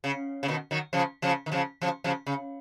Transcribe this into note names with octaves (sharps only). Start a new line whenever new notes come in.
C#3
C#3
B2 D#3
D#3 F#3
C#3 F3
C#3 F3
D#3
C#3 F3
C#3 F3
C#3 F3
C#3